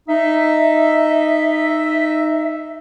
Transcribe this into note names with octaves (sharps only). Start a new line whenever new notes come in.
D#4 E5